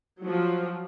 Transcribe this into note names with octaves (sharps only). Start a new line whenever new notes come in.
F3 F#3